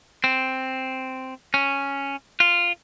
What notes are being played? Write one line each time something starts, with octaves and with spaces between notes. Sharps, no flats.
C4
C#4
F4